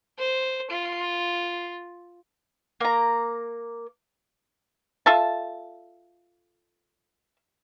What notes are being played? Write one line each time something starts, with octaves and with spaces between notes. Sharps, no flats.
C5
F4
A#3 A#5
F4 A4 E5 A5